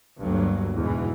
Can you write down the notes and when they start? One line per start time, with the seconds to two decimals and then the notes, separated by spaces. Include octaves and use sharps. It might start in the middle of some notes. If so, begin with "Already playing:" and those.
0.21 G1 D2 G2 F#3 A#3
0.75 E2 G#2 B2 E3